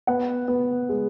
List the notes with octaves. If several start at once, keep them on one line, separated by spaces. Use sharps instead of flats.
B3 F#5
B3
G#3